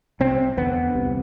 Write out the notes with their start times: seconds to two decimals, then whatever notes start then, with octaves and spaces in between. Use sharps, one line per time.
0.20 C2 C3 C4
0.57 E2 D3 B3
0.94 C2 C3